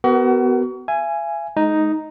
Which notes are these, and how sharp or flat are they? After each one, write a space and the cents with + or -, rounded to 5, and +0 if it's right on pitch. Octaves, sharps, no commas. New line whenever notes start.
B3 +15 F#4 +35 A#4 -5
E5 +45 G#5 +0
G#3 +30 D#4 +0